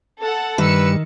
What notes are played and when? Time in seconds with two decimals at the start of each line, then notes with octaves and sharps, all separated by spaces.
0.21 A4 F#5
0.58 G2 D#3 B4 E6 C#7